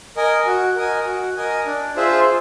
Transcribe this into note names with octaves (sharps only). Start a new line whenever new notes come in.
A#4 D#5 G#5
F#4
A#4 D#5 G#5
F#4
A#4 D#5 G#5
D4
F4 G#4 C5 E5